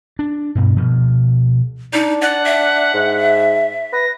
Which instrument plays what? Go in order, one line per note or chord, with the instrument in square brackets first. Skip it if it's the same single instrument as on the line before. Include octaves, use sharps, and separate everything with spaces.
[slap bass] D4
G2 B2
B2 F3
[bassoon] D4 [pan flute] D#4
[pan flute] D5 [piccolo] F#5
[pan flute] E5
[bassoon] G#2
[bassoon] B4 [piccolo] A#6